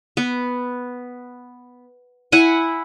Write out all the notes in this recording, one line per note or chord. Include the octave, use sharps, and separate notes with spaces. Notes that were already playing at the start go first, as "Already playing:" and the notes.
B3
E4 F#5 G#5